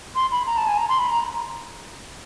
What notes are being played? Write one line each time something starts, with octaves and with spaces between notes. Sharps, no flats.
C6
B5
A#5
A5
G#5
A#5
C6
B5
A#5